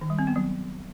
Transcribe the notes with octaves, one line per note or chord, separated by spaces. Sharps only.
D#3
G3
C4
B3
F#3